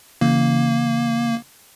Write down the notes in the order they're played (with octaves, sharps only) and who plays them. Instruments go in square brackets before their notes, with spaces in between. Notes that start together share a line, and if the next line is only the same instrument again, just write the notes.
[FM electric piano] C#3 E3 [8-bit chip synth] A#3